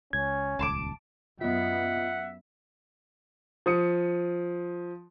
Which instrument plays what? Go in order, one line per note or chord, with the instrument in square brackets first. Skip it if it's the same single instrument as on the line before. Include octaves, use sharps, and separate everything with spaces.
[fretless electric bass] C#2 [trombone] C#4 [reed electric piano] G#6
[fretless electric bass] D#1 C#2 [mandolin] A5 C6 D6
[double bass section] F#2 B3 [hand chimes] F4 D#5 [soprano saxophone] E5 [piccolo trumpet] F#5
[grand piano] F3 D#6 C#7